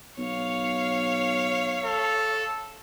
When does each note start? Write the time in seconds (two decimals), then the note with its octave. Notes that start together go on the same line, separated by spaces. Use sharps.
0.18 B1 C#5 F5
1.85 A4